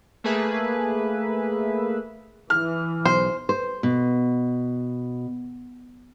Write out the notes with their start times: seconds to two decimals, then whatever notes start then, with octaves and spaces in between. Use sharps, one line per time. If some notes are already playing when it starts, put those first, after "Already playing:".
0.24 A3 A#3 G#4 B4 E5
2.50 E3 F6
3.06 B1 C5
3.49 C5
3.83 B2